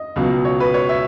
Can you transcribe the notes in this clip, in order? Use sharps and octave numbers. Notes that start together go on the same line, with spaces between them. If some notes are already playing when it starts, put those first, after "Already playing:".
Already playing: D#5
C#2 B2 F#3
C#5
B4
C#5
E5